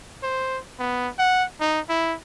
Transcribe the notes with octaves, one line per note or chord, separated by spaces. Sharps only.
C5
B3
F#5
D#4
E4